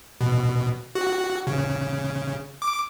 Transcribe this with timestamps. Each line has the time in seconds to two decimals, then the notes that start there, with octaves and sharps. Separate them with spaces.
0.21 B2
0.95 F#4
1.47 C#3
2.62 D6